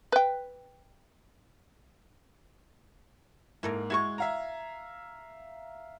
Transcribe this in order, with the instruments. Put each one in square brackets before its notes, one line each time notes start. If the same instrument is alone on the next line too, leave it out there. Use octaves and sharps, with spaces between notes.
[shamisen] B4 G5
[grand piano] G#2 A#3 [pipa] E4 A4 A#4
[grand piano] G#3 G#6 [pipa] E4 F#4 C#6
[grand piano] E5 F5 A#5